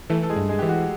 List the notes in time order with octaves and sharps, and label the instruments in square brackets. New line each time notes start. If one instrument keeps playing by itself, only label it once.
[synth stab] E3 [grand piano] A3 A4
[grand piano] A4
G#3 G#4
[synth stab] G2
[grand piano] G#3 G#4
[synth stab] E3 [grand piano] G4
[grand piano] F#4